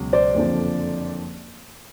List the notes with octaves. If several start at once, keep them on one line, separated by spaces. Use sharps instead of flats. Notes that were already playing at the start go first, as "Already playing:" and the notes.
Already playing: C#2 B2 F#3
C5 D5
F#1 F2 D3 F3